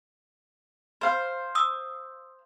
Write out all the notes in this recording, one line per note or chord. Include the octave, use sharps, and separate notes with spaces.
C5 F5
D#6 E6